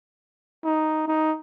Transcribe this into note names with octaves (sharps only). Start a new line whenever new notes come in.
D#4
D#4